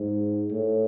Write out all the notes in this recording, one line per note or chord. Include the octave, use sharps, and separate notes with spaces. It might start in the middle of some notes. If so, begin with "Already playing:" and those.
Already playing: G#2
A2